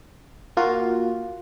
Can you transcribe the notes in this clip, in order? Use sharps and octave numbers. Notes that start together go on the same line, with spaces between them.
A#3 F4 F#4